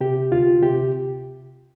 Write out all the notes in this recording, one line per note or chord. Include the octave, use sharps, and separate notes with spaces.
C3 G4
D2 F4
C3 G4